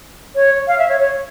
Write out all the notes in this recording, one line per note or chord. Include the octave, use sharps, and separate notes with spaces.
C#5
F5
E5
C#5
C#5